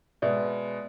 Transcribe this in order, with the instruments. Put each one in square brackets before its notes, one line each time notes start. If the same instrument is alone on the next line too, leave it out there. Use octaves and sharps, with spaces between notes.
[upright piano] B2 G#3 B3 [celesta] D5 E5